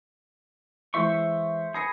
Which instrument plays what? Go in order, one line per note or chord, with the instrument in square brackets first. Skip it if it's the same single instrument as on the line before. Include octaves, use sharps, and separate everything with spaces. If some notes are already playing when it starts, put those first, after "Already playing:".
[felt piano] E3 G#3 [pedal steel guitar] C5 E5 C#6
[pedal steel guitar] G#4 [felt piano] B5 A#6 C#7